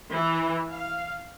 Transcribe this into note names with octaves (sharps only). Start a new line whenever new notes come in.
E3
F5